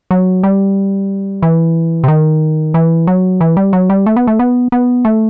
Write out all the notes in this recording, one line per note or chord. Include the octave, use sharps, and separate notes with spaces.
F#3
G3
E3
C3
D#3
E3
F#3
E3
G3
F#3
G3
A3
B3
A3
B3
B3
A3